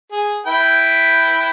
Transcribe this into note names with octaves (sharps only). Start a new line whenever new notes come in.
G#4
E4 B4 G5